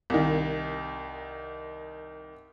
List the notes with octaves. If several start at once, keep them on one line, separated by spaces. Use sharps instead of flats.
C2 D#3